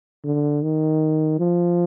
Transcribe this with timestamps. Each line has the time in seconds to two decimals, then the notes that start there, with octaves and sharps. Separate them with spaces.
0.25 D3
0.63 D#3
1.39 F3